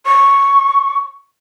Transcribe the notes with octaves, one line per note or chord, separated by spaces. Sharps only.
C#6